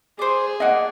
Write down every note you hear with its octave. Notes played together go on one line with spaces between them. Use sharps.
G#4 C5 D5
A#3 D4 D#5 F#5